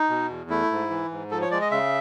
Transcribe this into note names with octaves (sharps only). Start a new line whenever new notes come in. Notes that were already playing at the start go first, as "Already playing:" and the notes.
Already playing: D#4
B2
E2
A3 E4
G#2
E3
G#2
F3 A4
C#5
G#3 D5
D#5
C#3 E5